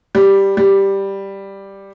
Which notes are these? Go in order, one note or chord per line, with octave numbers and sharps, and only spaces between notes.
G3
G3